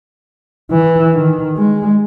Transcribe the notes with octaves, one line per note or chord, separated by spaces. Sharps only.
E3
D#3
G#3